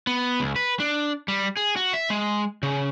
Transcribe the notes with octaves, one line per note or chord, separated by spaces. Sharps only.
B3
C#2
B4
D4
G3
G#4
F#4
E5
G#3
C#3